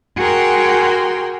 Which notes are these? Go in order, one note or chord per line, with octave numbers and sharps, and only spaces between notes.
F#4 G#4 A#4 G5 C6